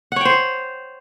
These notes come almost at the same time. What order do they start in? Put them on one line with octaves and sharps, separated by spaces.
F#5 C#5 G5 C5